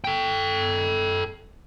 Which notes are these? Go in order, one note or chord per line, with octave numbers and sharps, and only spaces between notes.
A4 G5